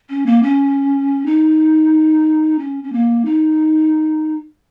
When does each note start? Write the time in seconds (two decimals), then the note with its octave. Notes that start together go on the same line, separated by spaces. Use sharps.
0.09 C#4
0.26 A#3
0.43 C#4
1.26 D#4
2.59 C#4
2.84 C#4
2.93 A#3
3.25 D#4